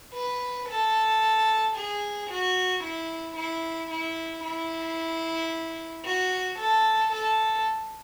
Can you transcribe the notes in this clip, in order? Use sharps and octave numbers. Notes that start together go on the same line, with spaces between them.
B4
A4
G#4
F#4
E4
E4
E4
E4
F#4
A4
A4